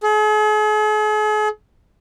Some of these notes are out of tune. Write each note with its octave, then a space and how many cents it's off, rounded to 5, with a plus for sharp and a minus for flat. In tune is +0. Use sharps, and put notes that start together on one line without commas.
G#4 +45